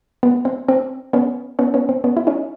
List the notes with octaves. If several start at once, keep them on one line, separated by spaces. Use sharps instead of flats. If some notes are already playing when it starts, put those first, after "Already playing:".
B3
C4
C4
B3 C#4
B3 C#4
B3 C#4
C4
B3 C#4
E4
C#4 D#4